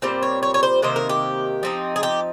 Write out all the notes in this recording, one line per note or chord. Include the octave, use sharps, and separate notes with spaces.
A#2 G3 C4 C5
C#5
C#5
C#5
C5
C3 D#3 A#3 C5
A#4
G4
F3 C4 D#4
G#4
G4